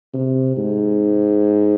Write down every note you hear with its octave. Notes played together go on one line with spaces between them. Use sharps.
C3
G#2